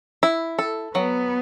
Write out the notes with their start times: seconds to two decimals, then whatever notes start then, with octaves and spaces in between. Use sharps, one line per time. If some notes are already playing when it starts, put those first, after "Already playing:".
0.23 E4
0.59 A4
0.94 F#3 B3